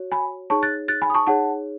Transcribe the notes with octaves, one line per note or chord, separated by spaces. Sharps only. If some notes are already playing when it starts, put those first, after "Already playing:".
Already playing: F#4 C#5
G#5 B5
D#4 G#4 C#5 A5 C#6
F#6 A6
F#6 A6
G#5 B5
D#6
A5 C#6
D#4 G#4 C#5 F#5 A5